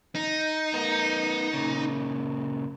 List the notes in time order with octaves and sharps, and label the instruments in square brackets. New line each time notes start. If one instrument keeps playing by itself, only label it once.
[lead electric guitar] D#4
[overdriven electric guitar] B3 A#4
A#2 C#3